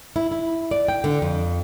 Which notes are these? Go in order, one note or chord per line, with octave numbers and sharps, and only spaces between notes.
E4
E4
D5
G5
D3
F2